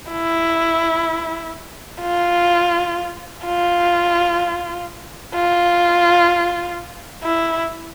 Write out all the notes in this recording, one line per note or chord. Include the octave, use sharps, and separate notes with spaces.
E4
F4
F4
F4
E4